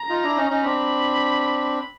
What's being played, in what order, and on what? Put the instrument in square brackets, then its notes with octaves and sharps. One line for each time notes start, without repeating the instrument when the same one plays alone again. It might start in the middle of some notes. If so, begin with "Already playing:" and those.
Already playing: [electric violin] A#5
[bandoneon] D#4 F4
D4 E4
C#4 D#4
C#4 D#4
[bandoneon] C4 D4 [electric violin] B5